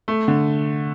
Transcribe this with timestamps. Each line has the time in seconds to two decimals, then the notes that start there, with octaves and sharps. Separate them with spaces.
0.08 A3
0.28 D3